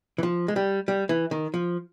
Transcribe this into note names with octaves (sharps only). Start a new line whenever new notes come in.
E3
F3
G#3
G3
G3
E3
D#3
F3